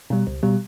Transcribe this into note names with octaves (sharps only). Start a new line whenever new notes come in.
B2 G3
C#2
B2 G3